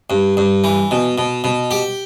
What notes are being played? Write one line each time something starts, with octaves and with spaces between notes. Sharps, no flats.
G2
G2
E3
B2
B2
B2
G4